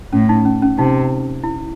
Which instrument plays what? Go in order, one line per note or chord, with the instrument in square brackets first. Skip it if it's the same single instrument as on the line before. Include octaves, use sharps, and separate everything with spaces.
[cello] A2 [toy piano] C#4
[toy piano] D#4
C#4
C#4
[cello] C3 [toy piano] D#4
[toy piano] E4